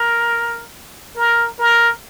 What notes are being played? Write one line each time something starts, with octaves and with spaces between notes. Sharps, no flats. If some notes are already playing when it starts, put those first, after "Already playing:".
Already playing: A#4
A#4
A#4